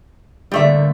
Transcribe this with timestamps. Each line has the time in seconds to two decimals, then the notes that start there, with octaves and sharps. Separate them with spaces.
0.52 A2 D3 G3 A3 A#3 E5